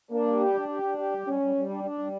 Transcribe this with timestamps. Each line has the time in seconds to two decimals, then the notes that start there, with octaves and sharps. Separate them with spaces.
0.11 A#3 D4
0.25 G3
0.40 G4
0.54 D4
0.69 G4
0.82 D4
0.98 G4
1.12 G3
1.27 G3 C#4
1.41 G3
1.55 G3
1.69 D4
1.84 D4
1.98 G3